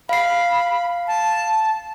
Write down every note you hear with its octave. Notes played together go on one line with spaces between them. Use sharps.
F5 B5 C7
A5